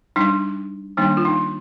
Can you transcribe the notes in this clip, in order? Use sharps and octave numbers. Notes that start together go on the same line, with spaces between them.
G3 D4 D#4
D#3 G3 A#3 D4 D#4
F4
D#4